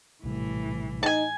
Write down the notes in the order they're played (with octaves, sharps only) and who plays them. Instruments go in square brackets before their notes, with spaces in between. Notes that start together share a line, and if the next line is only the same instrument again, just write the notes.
[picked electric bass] A#1 C3 G3 [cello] A2 E3
[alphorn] D#4 [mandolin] G#5 A5